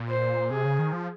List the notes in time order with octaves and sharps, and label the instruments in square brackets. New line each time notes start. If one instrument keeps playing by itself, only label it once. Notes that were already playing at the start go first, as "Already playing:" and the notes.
Already playing: [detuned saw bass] A#2
[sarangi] C5
[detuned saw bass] C3 [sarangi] G#4
[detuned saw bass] C#3
D#3
F3